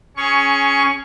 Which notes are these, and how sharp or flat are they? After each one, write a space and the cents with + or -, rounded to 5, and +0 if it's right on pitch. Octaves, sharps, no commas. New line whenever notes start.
C#4 +0 G#4 +15 C#6 +10